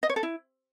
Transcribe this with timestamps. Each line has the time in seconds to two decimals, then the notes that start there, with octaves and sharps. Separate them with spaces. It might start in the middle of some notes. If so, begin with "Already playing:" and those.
0.03 D#5
0.09 C#5
0.16 A4
0.23 E4